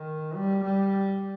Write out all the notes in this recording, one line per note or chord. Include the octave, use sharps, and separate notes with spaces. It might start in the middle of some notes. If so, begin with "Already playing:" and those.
Already playing: D#3
G3
G3